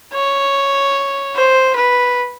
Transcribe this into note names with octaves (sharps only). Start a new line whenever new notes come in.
C#5
C5
B4